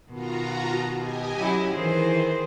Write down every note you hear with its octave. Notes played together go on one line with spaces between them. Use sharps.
B2 D#3 F4 F#4 A#5
G4 D#5 G#5
F#3 C#4 E4
D#3 E3 G#4 C5